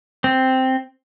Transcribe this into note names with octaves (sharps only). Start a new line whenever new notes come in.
C4